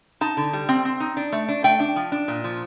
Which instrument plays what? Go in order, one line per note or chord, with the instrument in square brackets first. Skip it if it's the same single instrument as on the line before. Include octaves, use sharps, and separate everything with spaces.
[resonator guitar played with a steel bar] D#4 A5
D3
G3
C4
C4
D#4
D4
A3
D4
A3 G5
D4
F3
D4
A#2
F3